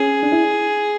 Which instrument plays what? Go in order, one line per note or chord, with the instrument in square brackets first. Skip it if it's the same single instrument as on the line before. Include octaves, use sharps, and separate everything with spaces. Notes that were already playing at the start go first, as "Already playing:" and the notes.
Already playing: [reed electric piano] C#4 [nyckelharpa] G#4
[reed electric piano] D4
E4